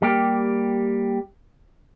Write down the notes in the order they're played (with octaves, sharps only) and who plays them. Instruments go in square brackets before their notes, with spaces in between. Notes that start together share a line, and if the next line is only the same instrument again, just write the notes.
[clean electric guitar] G3 A#3 G4